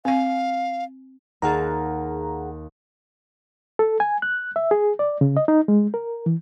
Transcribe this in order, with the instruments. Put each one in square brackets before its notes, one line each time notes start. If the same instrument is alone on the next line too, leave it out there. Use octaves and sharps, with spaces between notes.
[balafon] C4 G#5 [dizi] F5
[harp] D#2 F5 A5 [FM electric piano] G#4 F#5 A#5
[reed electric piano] A4
G#5
F#6
E5
G#4
D5
C#3
D#5
D#4
G#3
A#4
E3